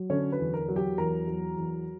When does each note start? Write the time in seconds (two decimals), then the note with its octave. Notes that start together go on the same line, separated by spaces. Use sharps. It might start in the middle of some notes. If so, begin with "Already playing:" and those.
Already playing: F#3
0.10 D3 C#4 C#5
0.32 B4
0.39 E2
0.54 A#4
0.68 F#3
0.76 G4 G5
0.98 E2 A#4 A#5
1.27 F#3
1.57 E2